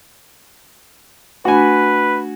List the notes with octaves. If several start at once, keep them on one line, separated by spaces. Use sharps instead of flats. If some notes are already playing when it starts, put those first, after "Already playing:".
A3 D4 F#4 B4 G#5